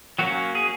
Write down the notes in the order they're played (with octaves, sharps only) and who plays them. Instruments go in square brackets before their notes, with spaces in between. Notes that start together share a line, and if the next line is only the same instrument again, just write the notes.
[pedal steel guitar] F#3 A#3 C#4 F#4
G#4